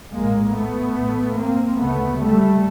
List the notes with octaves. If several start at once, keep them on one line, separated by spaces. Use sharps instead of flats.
A#1 A2 G#3 A#3
A3 B3
A1 A2
A#3 C4
D2 C#3 A3 B3
G3 A3